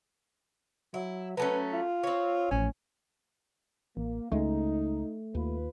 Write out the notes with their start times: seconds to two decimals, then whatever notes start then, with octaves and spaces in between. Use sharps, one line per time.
0.94 F#3 E4
1.37 F#3 A3 C#4 B4
1.73 F4
2.03 C4 C#5
2.51 A1 F3 C#4
3.97 A1 A#3
4.32 C#2 G#3 A3 D#4
5.35 D#2 F4 B4